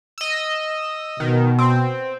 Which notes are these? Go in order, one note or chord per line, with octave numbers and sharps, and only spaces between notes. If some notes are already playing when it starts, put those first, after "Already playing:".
D#5 E6
B2 D#3
C4